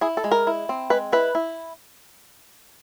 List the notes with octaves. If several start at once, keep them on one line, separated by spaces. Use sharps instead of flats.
E4 G#4
A4
G#3
A#4
E4
C4
G#3 B4
E4 B4
E4